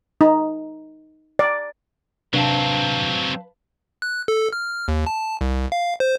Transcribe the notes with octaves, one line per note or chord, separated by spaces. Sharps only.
D#4
D5
C3 F#3 C4 D4 B4 F5 A5
F#6
A4
F6
D#2
A5
C2
F5
C5